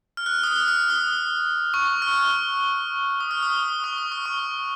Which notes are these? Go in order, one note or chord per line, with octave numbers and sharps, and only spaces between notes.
F6
F#6
D#6
F6
F6
D#6
C#6
F6
D#6
F6
D#6
D#6
C#6
D#6
F6
C#6